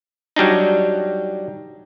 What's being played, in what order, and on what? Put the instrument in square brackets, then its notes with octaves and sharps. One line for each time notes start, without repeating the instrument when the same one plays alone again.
[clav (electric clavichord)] F#3 G3 D4 D#4